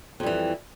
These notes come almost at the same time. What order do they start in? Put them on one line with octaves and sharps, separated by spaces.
F2 G3 E3